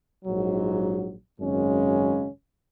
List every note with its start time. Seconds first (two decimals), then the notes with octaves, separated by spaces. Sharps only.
0.25 A#1 G#2 F#3
1.38 G#1 F#2 C#3 G#3 C#4